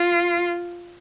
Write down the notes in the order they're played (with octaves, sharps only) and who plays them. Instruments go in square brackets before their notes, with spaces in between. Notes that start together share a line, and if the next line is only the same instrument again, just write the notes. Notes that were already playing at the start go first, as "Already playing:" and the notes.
Already playing: [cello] F4